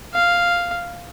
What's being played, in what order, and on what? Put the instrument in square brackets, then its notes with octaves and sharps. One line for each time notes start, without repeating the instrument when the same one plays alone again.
[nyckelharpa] F5